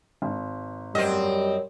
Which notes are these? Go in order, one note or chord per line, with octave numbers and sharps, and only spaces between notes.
G#1
F#2 G3 C4 D#5